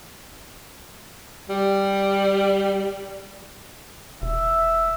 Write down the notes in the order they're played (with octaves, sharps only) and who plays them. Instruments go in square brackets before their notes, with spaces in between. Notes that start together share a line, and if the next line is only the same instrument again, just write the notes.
[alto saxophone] G3
[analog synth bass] E1 [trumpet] E5